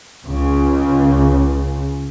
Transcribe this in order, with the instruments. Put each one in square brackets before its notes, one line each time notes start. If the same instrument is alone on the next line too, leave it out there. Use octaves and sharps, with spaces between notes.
[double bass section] C#2 C#3